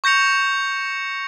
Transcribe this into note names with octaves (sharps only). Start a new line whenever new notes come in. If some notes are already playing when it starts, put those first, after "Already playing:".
C#6 G6 A#6 C#7 F7